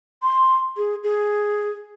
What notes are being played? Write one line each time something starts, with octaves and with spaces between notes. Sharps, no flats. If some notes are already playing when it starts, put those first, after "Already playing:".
C6
G#4
G#4